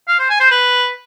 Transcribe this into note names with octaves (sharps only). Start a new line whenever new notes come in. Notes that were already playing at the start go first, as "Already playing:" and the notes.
F5
C5
G#5
C5
B4